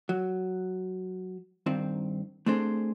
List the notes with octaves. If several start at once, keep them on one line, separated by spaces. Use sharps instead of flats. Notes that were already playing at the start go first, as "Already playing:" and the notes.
F#3
G2 D#3 C4
A3 C4 D4 G#4 C5